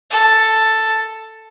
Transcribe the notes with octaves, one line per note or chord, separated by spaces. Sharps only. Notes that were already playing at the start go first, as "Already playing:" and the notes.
A4